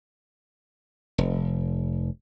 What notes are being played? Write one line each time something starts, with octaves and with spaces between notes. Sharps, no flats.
F1